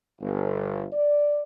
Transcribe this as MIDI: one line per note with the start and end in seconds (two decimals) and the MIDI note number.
0.20 0.84 31
0.92 1.41 74